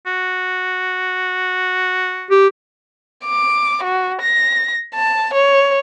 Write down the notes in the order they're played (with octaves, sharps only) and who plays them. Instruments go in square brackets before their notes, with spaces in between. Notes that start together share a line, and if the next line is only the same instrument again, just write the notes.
[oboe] F#4
[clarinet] G4
[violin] D6
F#4
A#6
A5
C#5